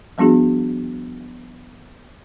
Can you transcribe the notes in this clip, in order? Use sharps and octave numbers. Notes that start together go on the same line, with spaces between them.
F3 G3 B3 D4 F#4 G#4